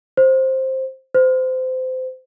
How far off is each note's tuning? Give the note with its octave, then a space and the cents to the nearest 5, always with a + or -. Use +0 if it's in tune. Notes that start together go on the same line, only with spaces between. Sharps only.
C5 +10
C5 -25